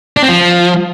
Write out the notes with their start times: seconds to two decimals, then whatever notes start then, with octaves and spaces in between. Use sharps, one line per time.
0.17 D4
0.23 C4
0.29 F3